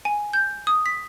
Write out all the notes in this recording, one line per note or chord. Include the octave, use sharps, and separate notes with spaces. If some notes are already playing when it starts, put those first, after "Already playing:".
G#5
G6
D#6
B6